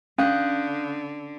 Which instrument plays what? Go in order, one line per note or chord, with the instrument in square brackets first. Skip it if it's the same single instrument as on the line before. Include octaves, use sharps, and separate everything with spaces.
[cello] D3 [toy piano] C#4 [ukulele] F5 [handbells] D#6 F#6 G6